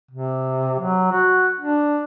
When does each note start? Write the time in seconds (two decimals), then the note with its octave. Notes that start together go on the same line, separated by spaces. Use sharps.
0.11 C3
0.79 F#3
1.12 F#4
1.60 D4